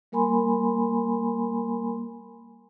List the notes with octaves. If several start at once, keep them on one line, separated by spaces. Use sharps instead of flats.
G3 A#3 A#4 G#5 B5 C6